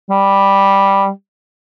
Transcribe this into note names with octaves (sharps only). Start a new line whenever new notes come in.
G3